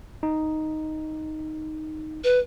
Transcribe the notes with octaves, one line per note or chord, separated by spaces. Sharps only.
D#4
B4